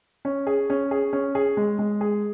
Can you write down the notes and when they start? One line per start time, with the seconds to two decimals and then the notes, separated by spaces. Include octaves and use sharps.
0.25 C#4
0.47 G#4
0.70 C#4
0.91 G#4
1.13 C#4
1.35 G#4
1.57 G#3
1.79 G#3
2.01 G#4